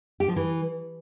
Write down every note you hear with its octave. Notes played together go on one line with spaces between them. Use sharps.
G4
F3
E3